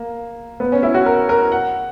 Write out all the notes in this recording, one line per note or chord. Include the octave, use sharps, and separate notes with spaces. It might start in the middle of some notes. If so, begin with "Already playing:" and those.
Already playing: A#3
B3
C#4
E4
F#4
A#4
A#4
F#5